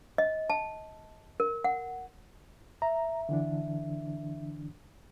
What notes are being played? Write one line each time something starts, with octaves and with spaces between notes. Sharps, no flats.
D#5
A5
A#4
F#5
E5 A#5
D3 E3 D4